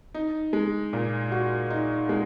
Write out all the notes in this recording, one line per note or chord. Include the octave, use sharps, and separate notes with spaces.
D#4
G#3
A#2
F#4
D#4
G#3